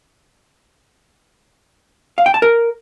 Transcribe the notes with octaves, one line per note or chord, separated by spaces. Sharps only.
F5
G5
A5
A#4